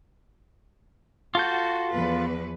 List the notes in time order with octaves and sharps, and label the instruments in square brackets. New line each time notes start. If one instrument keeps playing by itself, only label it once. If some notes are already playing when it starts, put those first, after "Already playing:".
[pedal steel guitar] F4 A4 G6 [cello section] F#4
[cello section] E2 F3 B4